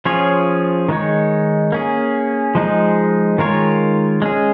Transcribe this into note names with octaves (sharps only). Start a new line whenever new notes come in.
F3 C#4 F4 G#4 C#5
D#3 G#3 D#4 C#5
A#3 C#4 G#4
F3 G#3 D#4 G#4
D#3 G#3 F4 A#4 C#5
G#3 C#4 G#4